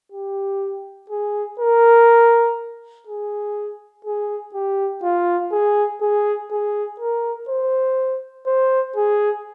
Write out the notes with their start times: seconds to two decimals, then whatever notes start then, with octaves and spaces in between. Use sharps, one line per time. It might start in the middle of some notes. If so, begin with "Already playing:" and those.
0.12 G4
1.10 G#4
1.60 A#4
3.07 G#4
4.05 G#4
4.54 G4
5.03 F4
5.52 G#4
6.01 G#4
6.51 G#4
7.00 A#4
7.49 C5
8.47 C5
8.96 G#4